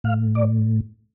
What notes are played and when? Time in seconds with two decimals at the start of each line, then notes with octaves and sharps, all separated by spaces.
0.04 A2 F5
0.35 D5